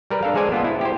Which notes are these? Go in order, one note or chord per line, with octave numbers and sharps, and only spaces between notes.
G3 A#4 B4
D4 A4 A#4 F5
G#3 G#4 A4 C5 D5 G#5
B3 F4 A4
E4
G4 C5